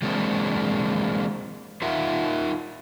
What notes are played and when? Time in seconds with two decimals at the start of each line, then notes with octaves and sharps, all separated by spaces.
0.02 E3 F#3 G#3 A#3 C4 D4
1.82 D#4 F4 A#4 E5 F#5